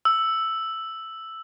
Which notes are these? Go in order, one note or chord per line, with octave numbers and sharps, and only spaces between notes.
E6